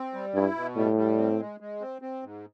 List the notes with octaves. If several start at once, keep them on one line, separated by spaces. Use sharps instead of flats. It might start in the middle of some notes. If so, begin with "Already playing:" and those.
Already playing: C4
G3
G2 E4
B2
A2 G3
G3
C4
G#3
G#3
C4
C4
G#2